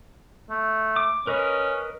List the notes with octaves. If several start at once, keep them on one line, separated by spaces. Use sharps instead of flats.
A3
D6
C#4 A#4 B4 D#5